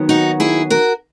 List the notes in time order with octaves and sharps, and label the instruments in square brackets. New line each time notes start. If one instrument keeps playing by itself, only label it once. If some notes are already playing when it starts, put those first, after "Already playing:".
Already playing: [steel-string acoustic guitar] D#2 D#3 F#3 B3
D#4 F#4
E4 G#4
F#4 A#4